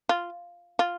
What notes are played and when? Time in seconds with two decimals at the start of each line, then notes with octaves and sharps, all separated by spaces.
0.09 F4
0.79 F4